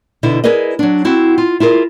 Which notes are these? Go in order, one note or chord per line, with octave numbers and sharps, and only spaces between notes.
B2 D3 D#4 E4
E4 G#4 A#4 B4 D5 D#5
F#3 D4
C4 E4 F#4
F4
E4 F4 G#4 A#4